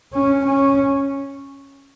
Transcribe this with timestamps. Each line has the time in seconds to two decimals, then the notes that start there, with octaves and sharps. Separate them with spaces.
0.13 C#4
0.46 C#4